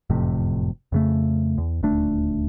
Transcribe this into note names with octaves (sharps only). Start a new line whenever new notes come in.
F#1 F2 A2 C3
F2 C#3 A3
E2
D#1 D2 A3 D4